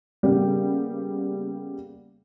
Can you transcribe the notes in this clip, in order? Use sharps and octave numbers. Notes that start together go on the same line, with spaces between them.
C#3 G3 A#3 B3 G4